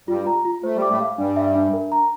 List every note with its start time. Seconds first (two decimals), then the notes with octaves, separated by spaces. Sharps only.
0.08 G2 G3 F4
0.27 A#5
0.45 F4
0.63 A3 C5
0.76 G3
0.82 D6
0.90 A2 A3
1.00 F5
1.18 G2 G3 D4
1.36 E5
1.55 D4
1.73 A#4
1.92 A#5